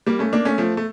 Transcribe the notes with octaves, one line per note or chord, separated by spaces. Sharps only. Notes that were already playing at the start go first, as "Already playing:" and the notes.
G3 A#3
A3 C#4
A#3 D4
A3 C#4
F3 A3
A3